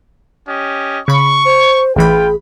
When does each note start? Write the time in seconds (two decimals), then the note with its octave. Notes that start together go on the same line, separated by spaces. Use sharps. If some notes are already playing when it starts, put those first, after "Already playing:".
0.48 C#4 G4 D#5
1.08 C#3 B5 C#6
1.45 C5
1.96 A1 E3 F4 G#4 G5 B5